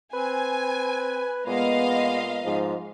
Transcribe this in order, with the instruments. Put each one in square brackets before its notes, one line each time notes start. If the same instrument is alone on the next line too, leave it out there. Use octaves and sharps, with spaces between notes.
[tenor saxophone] C4 [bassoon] B4 [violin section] G#5
[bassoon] A#2 [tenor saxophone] G#3 [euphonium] B3 [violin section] D#5 F5
[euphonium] G#2 [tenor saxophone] F3